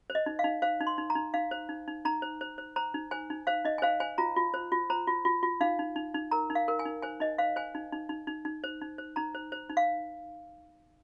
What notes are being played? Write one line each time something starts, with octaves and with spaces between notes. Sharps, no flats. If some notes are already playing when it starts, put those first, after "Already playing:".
C5
D#5
D#4
F5
D#4
C5 F5
D#4
C6
D#4
A#5
D#4
D#4 F5
C5
D#4
D#4
D#4 A#5
C5
C5
C5
C5 A#5
D#4
C5 G#5
D#4
C5 F5
D#4 D#5
G#5
C5 F5
C5 G#5
F4 A#5
F4
C5
F4
C5 A#5
F4
F4
F4
D#4 F5
D#4
D#4
D#4
A#4 A#5
D#4
F5
A#4
G#5
D#4
C5 G#5
D#4 D#5
C5 F5
C5 G#5
D#4
D#4
D#4
D#4
D#4
C5
D#4
C5
D#4 A#5
C5
C5
D#4
F5